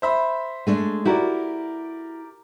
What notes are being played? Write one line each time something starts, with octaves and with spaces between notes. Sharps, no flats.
C5 E5 B5
G#3 A3 D4
E4 F#4 G4 A#4 D5